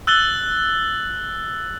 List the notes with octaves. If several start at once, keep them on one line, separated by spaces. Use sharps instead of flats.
E6 F#6 A6 F#7 G7